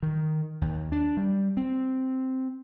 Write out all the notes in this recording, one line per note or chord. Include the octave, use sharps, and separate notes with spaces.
D#3
D#2
D4
G3
C4